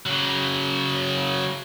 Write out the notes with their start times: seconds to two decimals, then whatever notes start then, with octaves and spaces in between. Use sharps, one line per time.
0.07 C#3 F#3